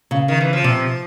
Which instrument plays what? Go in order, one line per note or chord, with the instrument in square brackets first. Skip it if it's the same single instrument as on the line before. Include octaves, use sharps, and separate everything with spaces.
[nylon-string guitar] C#3
[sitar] D#3
E3
F3
[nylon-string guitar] C3